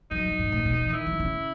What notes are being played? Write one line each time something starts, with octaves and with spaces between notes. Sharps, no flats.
F#2 D#4
F#2
G#2
A2
B2
E3
D#3 E4
D#3
C#3